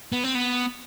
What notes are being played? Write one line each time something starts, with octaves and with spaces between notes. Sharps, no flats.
B3
C4
B3